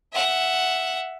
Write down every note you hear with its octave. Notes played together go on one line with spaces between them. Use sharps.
E5 F#5